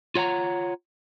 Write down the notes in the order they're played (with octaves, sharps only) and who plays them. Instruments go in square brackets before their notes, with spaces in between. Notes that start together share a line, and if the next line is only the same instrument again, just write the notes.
[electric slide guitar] F4 C#5 F#5 A#5